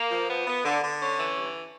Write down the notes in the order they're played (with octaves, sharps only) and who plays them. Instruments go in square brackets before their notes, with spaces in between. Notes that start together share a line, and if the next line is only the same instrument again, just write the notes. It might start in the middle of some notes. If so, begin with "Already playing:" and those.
Already playing: [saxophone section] A#3
F3
B3
B3
D3
D3
C#4
E3
G2